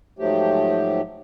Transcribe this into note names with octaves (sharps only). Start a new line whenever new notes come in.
G#2 F3 F#3 A3 G4